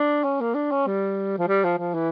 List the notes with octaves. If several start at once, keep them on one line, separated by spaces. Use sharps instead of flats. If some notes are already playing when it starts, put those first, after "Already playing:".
Already playing: D4
C#4
A#3
D4
C#4
G3
F3
G3
F3
F3
E3